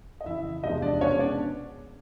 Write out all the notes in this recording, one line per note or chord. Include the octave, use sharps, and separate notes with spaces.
D#5
F2 C#3 E3 E4 E5
E2 C3 F3 G#3 D#4 D#5
D4 D5
B2 G#3 B3 C#4 D4 C#5
D4 D5